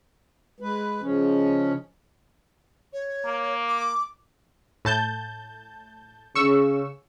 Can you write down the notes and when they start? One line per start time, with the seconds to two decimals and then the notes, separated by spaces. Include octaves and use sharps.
0.60 G#3 B4
1.02 C#3 F3 G#3 C#4
2.93 C#5
3.25 A#3
3.68 D6
4.85 A2 A5 G6
6.35 C#3 C#6 E6